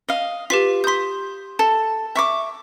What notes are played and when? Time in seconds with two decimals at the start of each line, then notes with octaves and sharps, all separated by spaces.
0.09 D#5 F5
0.50 F4 G4 B4 B6
0.84 C6 D#6 G6 B6
1.59 A4 A5
2.15 E5 C#6 D6